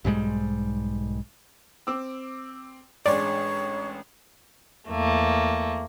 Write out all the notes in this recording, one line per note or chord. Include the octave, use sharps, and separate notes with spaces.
B1 G#2 G3 G#3
C4 D6 E6
A1 G#3 D4 C#5 D5
E2 A3 A#3